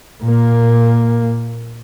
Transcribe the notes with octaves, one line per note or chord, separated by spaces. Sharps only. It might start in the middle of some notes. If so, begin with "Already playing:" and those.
A#2 A#3